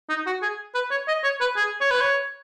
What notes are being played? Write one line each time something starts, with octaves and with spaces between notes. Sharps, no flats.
D#4
F#4
G#4
B4
C#5
D#5
C#5
B4
G#4
C#5
B4
C#5